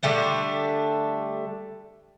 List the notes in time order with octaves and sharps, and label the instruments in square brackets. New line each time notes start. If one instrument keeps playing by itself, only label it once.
[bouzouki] D3 G3 A3 D4